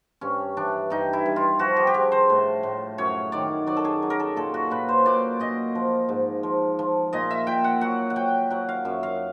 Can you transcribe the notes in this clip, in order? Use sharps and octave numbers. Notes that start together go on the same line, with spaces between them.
G2 C#4
E3 D4
G2 D#4
E4
G2
F4
F3 F#4
G4
G4
F3 G#4
C5
A2
A2
F#2 C#5
D#3 D5
F#3 D5
A4
G#4
F#3
A#4
A4
A#2 A4
F#4
A#2 B4
C5
A#2 D5
A#2 D#5
F3
G#2
F3
F3
A#2 D#5
E5
A#2 G5
F#5
F#3 F#5
F#5
F#3 G5
F#3 F#5
F5
F#2 E5
F5